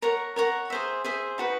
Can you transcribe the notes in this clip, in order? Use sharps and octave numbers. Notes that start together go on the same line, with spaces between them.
A#4 C#5 F#5 A#5
A#4 C#5 F#5 A#5
G#4 C5 E5
G#4 C5 E5
D#4 F#4 B4